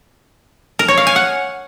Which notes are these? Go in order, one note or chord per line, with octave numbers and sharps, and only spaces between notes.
A#4
C#5
F5
G#5
F#5